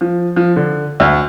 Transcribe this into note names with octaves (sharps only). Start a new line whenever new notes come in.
F3
F3
D3
D2